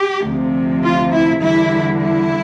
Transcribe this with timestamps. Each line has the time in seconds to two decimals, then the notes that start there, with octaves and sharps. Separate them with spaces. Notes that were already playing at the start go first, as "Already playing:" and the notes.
Already playing: G4
0.24 D2 C3 F3
0.83 F4
1.12 E4
1.41 E2 D3 G3 E4
2.00 E4